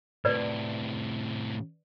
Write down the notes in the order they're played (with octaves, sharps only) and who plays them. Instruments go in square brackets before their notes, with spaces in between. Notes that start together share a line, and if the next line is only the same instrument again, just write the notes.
[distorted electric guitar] A2 C3 [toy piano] B4 D5